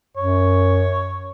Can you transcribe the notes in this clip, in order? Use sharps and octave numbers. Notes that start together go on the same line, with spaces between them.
F#2 C#5